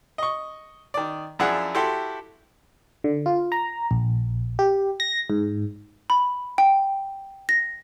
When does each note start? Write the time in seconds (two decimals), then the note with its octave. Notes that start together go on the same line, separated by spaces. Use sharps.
0.18 D#5 C#6
0.94 D#3 D5
1.39 F#2 F3 D4 E4 G#4 F#5
1.75 E4 F#4 G4 A4 C6
3.04 D3
3.26 F4
3.52 A#5
3.91 A#1
4.59 G4
5.00 A#6
5.30 G#2
6.10 B5
6.58 G5
7.49 A#6